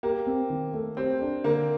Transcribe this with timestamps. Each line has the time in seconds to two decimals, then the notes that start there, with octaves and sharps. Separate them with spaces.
0.03 A#3 G4
0.27 C4
0.50 D#3
0.74 A3
0.97 C4 G4
1.21 D4
1.44 D3 A#3